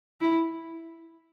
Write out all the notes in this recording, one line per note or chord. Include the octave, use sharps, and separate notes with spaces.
E4